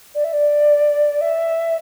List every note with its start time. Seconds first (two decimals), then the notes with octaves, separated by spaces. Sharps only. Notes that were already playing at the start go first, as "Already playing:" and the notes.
0.14 D5
0.24 E5
0.33 D5
1.21 E5